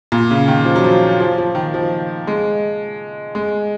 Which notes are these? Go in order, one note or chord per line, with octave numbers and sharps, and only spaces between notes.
A#2
C#3
D#3
F3
F#3
F3
F3
F3
D#3
F3
G#3
G#3